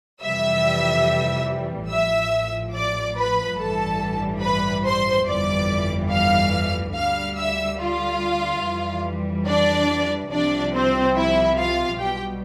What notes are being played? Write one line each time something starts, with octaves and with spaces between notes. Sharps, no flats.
F2 C3 E3 G3 E5 E6
A1 A2 F3 E5 E6
D5 D6
B4 B5
A1 G2 E3 G3 A4 A5
B4 B5
C5 C6
G1 F2 E3 G3 D5 D6
F5 F6
D2 D3 G3 F5 F6
E5 E6
F4 F5
F2 E3 G3
D4 D5
C2 C3 F3 D4 D5
C4 C5
E4 E5
F4 F5
B1 B2 G3 G4 G5